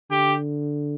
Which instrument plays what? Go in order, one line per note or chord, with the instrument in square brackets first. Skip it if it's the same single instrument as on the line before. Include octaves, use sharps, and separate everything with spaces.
[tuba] D3 [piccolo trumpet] G4